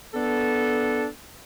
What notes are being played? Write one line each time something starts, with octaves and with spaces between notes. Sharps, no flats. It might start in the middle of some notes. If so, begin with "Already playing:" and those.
B3 D4 A4